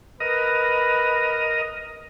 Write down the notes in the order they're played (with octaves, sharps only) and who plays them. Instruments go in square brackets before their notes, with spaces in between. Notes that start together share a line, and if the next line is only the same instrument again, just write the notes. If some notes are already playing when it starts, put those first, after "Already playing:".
[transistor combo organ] A#4 D#5 [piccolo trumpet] B4